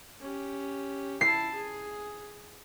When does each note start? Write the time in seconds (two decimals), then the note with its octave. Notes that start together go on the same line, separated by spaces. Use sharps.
0.21 C#4 G4
1.21 E4 A5 C7
1.54 G#4